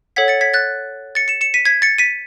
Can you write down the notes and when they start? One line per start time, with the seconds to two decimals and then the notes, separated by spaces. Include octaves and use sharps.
0.16 A4 C#5 F#5 G#6 B6
0.28 A6 C#7
0.41 G#6 B6
0.53 F#6 A6
1.15 A6 C#7
1.28 C#7 E7
1.41 C#7 E7
1.54 B6 D#7
1.65 G#6 B6
1.82 A6 C#7
1.98 B6 D#7